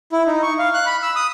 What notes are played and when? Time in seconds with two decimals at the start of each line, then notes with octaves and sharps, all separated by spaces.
0.12 E4
0.26 D#4
0.43 C#6
0.59 F5
0.74 F#6
0.86 B5
1.03 E6
1.16 D#6